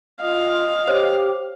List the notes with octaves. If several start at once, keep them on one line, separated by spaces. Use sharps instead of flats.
F4 D#5 F5
G4 C5 C#5